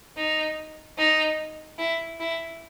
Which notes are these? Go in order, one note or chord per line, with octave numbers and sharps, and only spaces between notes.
D#4
D#4
E4
E4